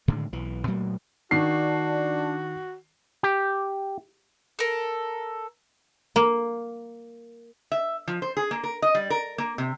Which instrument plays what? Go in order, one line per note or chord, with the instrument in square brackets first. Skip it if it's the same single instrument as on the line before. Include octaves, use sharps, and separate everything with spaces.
[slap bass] A2 D3 D#3 G#3
B1 E3
A#2 F#3 A3 A#3
[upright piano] D#3 C7 [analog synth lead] D4 [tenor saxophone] F#4
[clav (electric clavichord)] G4
[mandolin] A4 A#4
[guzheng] A#3
[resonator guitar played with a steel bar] E5
F3
C5
G#4
A#3
A#4
D#5
G3
A#4
A#3
C3